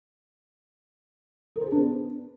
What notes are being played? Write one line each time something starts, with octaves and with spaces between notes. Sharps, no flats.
A#4
C5
G#4
D4
B3